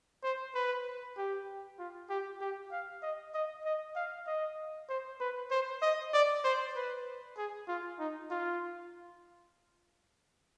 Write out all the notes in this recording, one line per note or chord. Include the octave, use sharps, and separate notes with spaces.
C5
B4
G4
F4
G4
G4
F5
D#5
D#5
D#5
F5
D#5
C5
B4
C5
D#5
D5
C5
B4
G#4
F4
D#4
F4